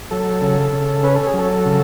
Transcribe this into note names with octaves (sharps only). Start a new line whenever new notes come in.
F#3 A4
C#3
C#3
C#4 B4
A4
G#4
F#3
A4
C#3